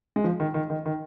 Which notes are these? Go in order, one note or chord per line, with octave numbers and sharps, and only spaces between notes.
G#3
F3
D#3
D#3
D#3
D#3